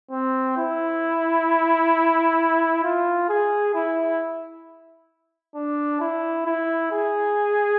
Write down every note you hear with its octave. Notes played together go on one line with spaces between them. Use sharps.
C4
E4
F4
G#4
E4
D4
E4
E4
G#4